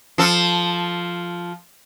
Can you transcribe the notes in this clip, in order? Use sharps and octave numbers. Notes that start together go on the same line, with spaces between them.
F3 A4